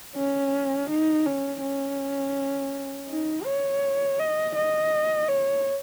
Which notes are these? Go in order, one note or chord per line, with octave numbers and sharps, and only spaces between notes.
C#4
D#4
C#4
C#4
D#4
C#5
D#5
D#5
C#5